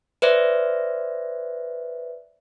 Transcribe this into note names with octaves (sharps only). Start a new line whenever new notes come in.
B4 C5 D5 E5